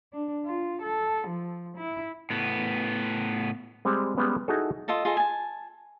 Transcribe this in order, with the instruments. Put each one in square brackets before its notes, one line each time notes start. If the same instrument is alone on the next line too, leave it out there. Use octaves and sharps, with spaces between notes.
[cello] D4
F4
A4
F3
E4
[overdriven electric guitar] A2 B3
[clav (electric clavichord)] G3 G#3 C4
G3 G#3 B3 C#4
D#4 E4 F#4 G#4 A4
[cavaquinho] F4 A4 D#5 A5
F4 G#4 A4 D#5
G#5 A5